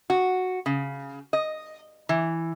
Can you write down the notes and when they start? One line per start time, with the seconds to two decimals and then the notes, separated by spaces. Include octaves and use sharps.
0.10 F#4
0.66 C#3
1.33 D#5
2.09 E3